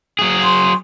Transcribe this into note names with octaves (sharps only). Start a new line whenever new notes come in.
F#3 G#4
C6